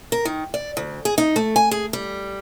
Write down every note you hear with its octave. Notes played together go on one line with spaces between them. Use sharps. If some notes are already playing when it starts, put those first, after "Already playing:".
A#4
D#3
D5
D2
G#4
D#4
A3
G#5
G#4
G3